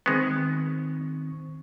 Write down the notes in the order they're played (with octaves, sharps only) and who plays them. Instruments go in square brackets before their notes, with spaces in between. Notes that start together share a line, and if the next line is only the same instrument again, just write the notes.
[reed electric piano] D#3 C4 C#6 [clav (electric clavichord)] G#3 B3